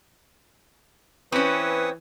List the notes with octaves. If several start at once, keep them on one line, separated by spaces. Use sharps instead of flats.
E3 C4 C#4 B4 C#6 D#6